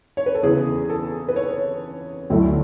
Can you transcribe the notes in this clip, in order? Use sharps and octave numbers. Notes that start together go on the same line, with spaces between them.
C#5
B4
A4
E2 C#3 E3 G#4
A4
B4
C#5
D2 D3 F#3 A3 E4